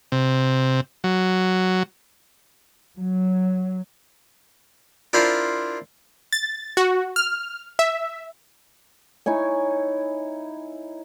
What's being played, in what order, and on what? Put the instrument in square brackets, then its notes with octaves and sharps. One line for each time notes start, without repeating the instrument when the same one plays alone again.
[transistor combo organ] C3
F#3
[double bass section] F#3
[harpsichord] D4 E4 F4 A#4 C5 A5
[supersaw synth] A6
F#4
F6
E5
[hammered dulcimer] D#4 E4 C#5 G#5